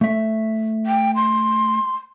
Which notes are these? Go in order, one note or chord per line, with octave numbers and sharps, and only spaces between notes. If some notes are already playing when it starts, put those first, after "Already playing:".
A3 E5
G5
C6